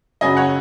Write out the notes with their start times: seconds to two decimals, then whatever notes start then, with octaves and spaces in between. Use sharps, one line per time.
0.21 F#2 C#3 F#3 C#4 D#5 G#5
0.37 C#5 F#5